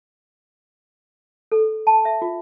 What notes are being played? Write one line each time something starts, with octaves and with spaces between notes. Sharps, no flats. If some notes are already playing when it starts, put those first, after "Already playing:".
A4
A5
E5
F4